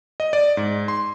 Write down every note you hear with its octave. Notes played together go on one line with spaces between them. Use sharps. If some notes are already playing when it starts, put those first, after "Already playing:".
D#5
D5
G#2
C6